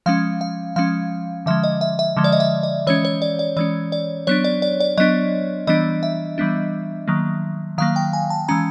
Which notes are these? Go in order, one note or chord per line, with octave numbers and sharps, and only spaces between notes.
F3 G#3 C#4 F5
F5
F3 G#3 C#4 F5
D3 F3 G#3 E5
D#5
E5
E5
D3 F3 G#3
D5
D#5
E5
D#5
E3 G#3 C#4 C#5
C#5
D5
D5
E3 G#3 C#4 D5
D5
F#3 B3 D4 C#5
D5
D5
D5
F#3 B3 D4 D#5
E3 G3 B3 D4 D#5
E5
E3 G3 B3 D4
D#3 F#3 A#3
D#3 F#3 A#3 F5
G5
G#5
A5
E3 G#3 C#4 A#5